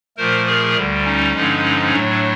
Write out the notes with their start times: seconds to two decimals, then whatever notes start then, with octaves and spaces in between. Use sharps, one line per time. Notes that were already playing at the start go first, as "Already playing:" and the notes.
0.17 A#2 F3 A3 A#4 C5
0.47 G#4 A#4
0.75 D2 D3 G3
1.04 C#4 D#4
1.34 G2 D3 F3 G#3
1.92 A2 F#3 A3 D4